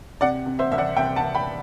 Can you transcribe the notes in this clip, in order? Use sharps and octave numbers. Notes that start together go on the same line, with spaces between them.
C3 D5 F#5
C3
C5 E5
C2 E5
D5 F#5
C2 E5 G5
F#5 A5
C2
G5 B5